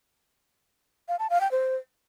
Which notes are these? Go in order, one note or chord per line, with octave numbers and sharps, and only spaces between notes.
F5
A5
F5
G5
C5